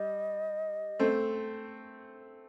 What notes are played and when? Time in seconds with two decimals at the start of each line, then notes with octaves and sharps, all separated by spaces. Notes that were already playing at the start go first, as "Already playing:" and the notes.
Already playing: G3 D#5
0.99 A3 C4